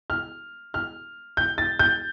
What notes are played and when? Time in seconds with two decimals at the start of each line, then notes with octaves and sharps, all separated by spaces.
0.10 F6
0.74 F6
1.37 G6
1.58 A6
1.79 G6